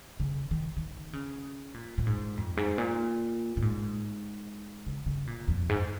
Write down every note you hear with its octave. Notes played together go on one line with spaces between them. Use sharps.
C#3
D#3
D#3
C#3
A#2
A#2
G#2
F2
G#2
A#2
A#2
G#2
C#3
C#3
A#2
F2
G#2